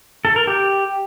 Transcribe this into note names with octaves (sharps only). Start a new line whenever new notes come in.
A4
A#4
G4